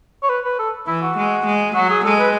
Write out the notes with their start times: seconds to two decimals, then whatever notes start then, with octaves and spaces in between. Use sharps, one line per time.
0.23 C#5
0.29 B4
0.45 B4
0.59 A4
0.87 E3 E4
1.02 F#4
1.17 G#3
1.45 G#3
1.75 F#3 F#4
1.90 G#4
2.04 G#3 A4
2.19 B4